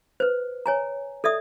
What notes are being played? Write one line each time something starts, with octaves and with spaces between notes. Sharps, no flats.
B4 C5
C#5 G#5 A#5
A4 D5 E5 D#6